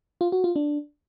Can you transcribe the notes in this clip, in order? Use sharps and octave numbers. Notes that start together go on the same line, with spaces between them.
F4
F#4
F4
D4